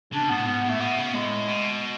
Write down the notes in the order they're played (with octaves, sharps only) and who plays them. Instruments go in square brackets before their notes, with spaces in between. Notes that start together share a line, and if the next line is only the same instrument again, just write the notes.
[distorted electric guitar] C#3 [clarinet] D4
[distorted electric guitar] B2
[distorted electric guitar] G#2 [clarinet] B3
[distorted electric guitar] A2
[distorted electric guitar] G#2 [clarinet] B3
[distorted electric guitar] A2
[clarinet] A3
[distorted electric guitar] B2 [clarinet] B3
[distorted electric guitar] C#3
[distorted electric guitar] A2 [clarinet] G#3
[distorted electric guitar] B2